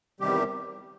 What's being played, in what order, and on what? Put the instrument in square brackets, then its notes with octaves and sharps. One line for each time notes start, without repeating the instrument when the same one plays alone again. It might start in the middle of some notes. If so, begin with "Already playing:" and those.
[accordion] E2 C3 D#3 G3 G4